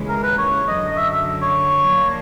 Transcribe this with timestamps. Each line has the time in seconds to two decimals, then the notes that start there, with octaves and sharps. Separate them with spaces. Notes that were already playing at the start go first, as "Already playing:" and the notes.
Already playing: D#2 C#3 E3 G#3
0.08 A#4
0.23 B4
0.38 C#5
0.67 F#2 D3 F#3 D#5
0.91 D#5
0.96 E5
1.12 E5
1.41 C#5
1.86 A#2 F3 A#3 D4